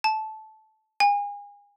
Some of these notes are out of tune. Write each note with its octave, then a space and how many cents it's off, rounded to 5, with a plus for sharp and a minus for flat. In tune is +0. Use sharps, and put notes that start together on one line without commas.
A5 -15
G#5 -35